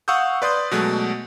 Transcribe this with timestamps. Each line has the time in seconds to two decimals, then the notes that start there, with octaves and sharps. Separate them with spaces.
0.08 F5 F#5 C#6 D#6 E6 G6
0.42 B4 D5 C6 D#6 G6
0.71 B2 F#3 G#3 A3 F#6